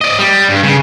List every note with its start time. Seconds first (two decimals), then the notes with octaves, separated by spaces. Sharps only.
0.01 D5 D#5
0.19 G3
0.49 G2
0.63 C#3